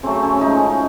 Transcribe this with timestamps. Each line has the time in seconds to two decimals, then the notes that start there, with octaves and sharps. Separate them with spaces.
0.03 C#3 F#3 A3 C4
0.23 C#4
0.41 A2 F3 G#3 D#4